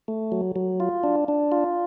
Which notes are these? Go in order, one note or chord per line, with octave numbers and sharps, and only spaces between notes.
A3
F#3
F#3
F4
D4
D4
F4